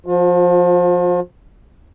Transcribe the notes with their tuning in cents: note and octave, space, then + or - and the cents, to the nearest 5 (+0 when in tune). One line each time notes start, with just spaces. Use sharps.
F3 +15 F4 +45